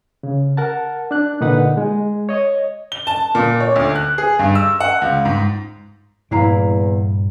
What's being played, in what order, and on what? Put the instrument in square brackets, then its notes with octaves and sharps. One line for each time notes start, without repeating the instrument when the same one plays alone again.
[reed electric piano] C#3
A#4 F#5 A5
D4 F#6
A#2 D3 D#4 B4 F#5
G#3
C#5 D#5
[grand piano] G7
A5
A#2
C#5
D2
F#6
G#4
G2
E6
F#5
C#2
G#2
[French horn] E2 [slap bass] G2 A#2 A#3 [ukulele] E4 F5 A#5